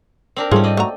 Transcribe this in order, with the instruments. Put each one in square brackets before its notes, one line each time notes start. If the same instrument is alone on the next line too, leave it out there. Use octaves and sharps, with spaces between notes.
[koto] C4 D4 A#4
[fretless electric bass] G#2 G3 [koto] A3 C#4 [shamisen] F4 G#4 C5
[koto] C4 D5 D#5
[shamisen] A3 F#4 A#5